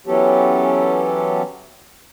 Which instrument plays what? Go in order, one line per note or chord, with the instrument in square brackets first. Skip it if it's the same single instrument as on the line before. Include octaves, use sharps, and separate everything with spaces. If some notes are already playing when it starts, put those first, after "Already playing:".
[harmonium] E3 F#3 B3 C#4 G4 A4